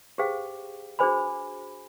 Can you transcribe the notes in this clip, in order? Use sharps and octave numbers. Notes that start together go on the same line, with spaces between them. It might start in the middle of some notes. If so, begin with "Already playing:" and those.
G4 G#4 C5 F5 G5
D4 F#4 G#4 C5 G#5 B5